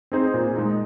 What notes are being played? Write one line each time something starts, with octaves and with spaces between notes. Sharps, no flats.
C4 D#4 G#4 C5
A#2
G#3 D#4